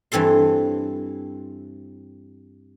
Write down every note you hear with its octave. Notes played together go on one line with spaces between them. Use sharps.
G2 E3 C4 A4 C6